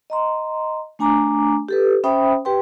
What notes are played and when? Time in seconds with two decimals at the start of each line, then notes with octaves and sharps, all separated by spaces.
0.10 D#5 A#5 C6
0.99 A3 D4 G#5 A#5 D6
1.69 G4 A4 B4
2.04 C#4 C5 E5 G5 B5 D#6
2.45 G4 B4 G5 C6